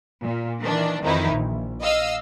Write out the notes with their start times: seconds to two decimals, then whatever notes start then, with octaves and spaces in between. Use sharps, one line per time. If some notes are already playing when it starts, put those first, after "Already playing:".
0.23 A#2
0.61 D#3 E3 D4
1.02 F2 D#3 E3 D#4 E4
1.32 A#1
1.82 D#5 F5 E6